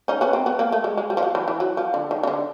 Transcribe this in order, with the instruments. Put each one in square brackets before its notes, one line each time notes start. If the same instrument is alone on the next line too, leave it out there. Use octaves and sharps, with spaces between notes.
[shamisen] C#4 D#4
B3 C#4
C4
B3
A#3
A3
G#3
G#3
G3
F3
F#3
E3
E3
F#3
F3
D3
D#3
C#3
D3